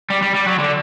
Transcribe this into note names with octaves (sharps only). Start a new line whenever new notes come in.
G3
G3
G3
F#3
D3